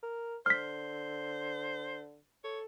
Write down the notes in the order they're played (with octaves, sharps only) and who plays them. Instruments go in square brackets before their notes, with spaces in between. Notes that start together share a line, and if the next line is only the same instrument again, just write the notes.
[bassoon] A#4
[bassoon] D3 [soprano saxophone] C5 [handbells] F6 B6
[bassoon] A4 [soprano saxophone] C#5